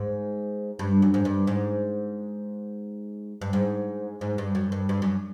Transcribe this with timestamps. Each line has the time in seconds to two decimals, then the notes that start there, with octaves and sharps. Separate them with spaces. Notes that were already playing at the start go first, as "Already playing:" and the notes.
Already playing: G#2
0.79 G2
1.02 F#2
1.14 G#2
1.25 G2
1.47 G#2
3.41 G2
3.53 G#2
4.21 G#2
4.38 G2
4.55 F#2
4.72 G2
4.89 G2
5.02 F#2